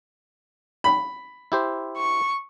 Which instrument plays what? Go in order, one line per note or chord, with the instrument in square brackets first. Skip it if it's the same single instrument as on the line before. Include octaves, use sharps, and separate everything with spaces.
[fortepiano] B5
[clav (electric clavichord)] E4 G4 C5
[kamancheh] C#6